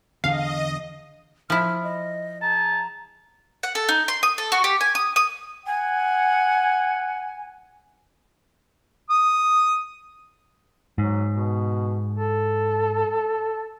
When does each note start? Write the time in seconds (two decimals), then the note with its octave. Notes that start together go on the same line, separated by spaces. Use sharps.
0.24 E2 D3 D#5 F5
1.50 F3 E4 F6
1.84 D#5
2.42 G#4 A5 A#5
3.63 F#5
3.75 A4
3.89 D#4
4.08 C6
4.23 D#6
4.38 A4
4.52 F#4
4.64 G4
4.81 G#5
4.95 D#6
5.16 D#6
5.66 F#5 G#5
9.10 D#6
10.98 G#2 F#3
11.33 B2
12.17 A4